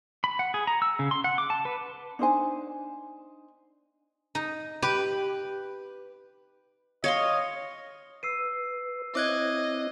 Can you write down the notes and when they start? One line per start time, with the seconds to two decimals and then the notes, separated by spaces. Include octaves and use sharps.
0.24 B5
0.39 F#5
0.54 G#4
0.67 A#5
0.82 E6
0.99 C#3
1.11 C6
1.24 F#5
1.38 D6
1.50 A5
1.65 B4
2.19 D4 D#4 C5 G#5
4.35 D#4
4.82 G4 B4
7.04 C#5 D#5 F5 C6
8.23 B4 E6 C7 D#7
9.15 C4 E4 C#5 D#5 D6 F#6 G#6